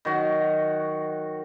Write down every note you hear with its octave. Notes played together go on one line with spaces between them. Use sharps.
D#3 F#3 F#4